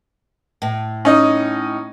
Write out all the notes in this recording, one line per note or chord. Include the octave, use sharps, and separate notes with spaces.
A2
C#4 D#4 D#5